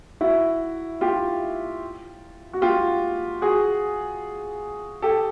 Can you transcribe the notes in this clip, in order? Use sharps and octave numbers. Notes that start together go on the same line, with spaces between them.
E4 F#4
F4 G4
F#4
F4 G4
F#4 G#4
G4 A4